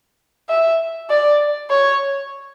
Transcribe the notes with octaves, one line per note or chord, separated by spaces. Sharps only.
E5
D5
C#5